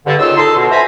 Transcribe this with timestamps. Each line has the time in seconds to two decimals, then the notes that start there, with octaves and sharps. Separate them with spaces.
0.06 G2 D3
0.19 D#2 C#3 D#4 F4 E6
0.37 D#4 A4 C6
0.56 B2
0.71 A4 C5 E5 G#5 A#5 B5